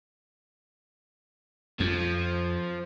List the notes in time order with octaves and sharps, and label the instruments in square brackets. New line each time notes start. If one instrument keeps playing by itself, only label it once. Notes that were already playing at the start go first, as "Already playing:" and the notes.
[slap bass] F2 [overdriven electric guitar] F3